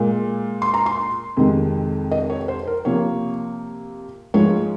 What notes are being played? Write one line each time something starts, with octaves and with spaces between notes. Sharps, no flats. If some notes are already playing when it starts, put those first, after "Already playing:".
Already playing: A#2 G#3
C6
A#5
C6
F2 C3 D#3 G#3
D#5
C#5
C5
A#4
C3 F3 A#3 C#5
G#2 F3 G#3 C#5